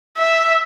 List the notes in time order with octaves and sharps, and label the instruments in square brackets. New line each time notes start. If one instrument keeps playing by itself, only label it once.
[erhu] E5